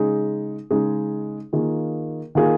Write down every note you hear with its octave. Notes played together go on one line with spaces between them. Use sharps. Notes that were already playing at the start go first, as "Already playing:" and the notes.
Already playing: C#3 G#3 D#4 G#4
C#3 G#3 D#4 G#4
D#3 A#3 F4 G#4
D#3 A#3 F4 G#4